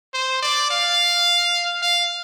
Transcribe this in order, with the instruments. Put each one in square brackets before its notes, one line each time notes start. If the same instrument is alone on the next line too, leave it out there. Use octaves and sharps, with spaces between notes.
[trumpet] C5
D5
F5
F5